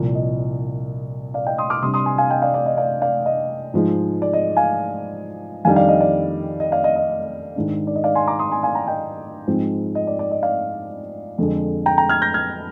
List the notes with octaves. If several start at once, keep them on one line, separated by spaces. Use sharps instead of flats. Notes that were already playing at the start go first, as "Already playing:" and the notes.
Already playing: C2 A#2 F3
D#5
D5 F5
D#5 G5
C6 D#6
D6 F6
C3 G3 D4 C6 D#6
C6 D#6
G#5 C6
F5 G#5
D#5 G5
D5 F5
D5
D#5
D5 F5
D5 F5
D#5
G#2 F3 G#3
D5
D#5
F5 G#5
F2 D#3 G3 D4 F5 G#5
D5 F5
D#5
D5
D#5
D5 F5
D#5
D#5
G#2 D#3 G#3 D4
D5
D#5
D5 F5
G#5 C6
A#5 D6
C6 D#6
G#5 C6
F5 G#5
G5 A#5
D#5 G5
G#2 F3 G#3 C4 D#4
D#5
D5
D5
D#5
D5 F5
F2 D3 G#3
G5 A#5
G5 A#5
F6 G#6
G6 A#6
F6 G#6